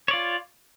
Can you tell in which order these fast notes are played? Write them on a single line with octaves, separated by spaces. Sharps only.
C#5 D5 F4